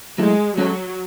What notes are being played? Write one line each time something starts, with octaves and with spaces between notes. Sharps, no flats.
F#3 G#3 A3 E4
F#3 G#3 C#4 F#4 A4 C#5